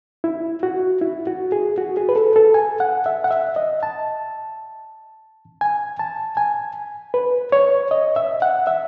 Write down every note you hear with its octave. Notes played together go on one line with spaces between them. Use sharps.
E4
F#4
E4
F#4
G#4
F#4
G#4
B4
A4
A4
G#5
F#5
E5
F#5
E5
D#5
A5
G#5
A5
G#5
B4
C#5
D#5
E5
F#5
E5